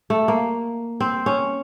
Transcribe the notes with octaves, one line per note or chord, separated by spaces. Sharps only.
A3
A#3
C4
C#4